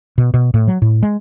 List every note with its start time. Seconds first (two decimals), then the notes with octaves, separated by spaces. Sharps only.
0.18 B2
0.34 B2
0.54 A2
0.68 F#3
0.82 A2
1.03 G#3